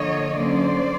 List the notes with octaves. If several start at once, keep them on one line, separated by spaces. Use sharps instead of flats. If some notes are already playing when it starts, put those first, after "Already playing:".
Already playing: D3 F3 A#3 C#5 D#5
D3 F#3 A#3 C#4 C5 D5